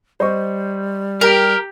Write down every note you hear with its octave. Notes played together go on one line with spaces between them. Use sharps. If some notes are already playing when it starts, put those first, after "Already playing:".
G3 C5 D#5 C#6
G4 A#4 G5 A#5 B6